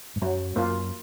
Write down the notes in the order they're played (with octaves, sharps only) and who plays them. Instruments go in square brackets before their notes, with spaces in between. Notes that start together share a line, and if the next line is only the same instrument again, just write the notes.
[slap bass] G#2
[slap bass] F#2 [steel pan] F#3
[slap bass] F#2 [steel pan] A#3 F4